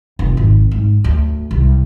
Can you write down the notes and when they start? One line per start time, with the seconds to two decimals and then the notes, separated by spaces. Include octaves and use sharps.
0.19 F1
0.37 G#1
0.71 G#2
1.04 D2
1.51 C2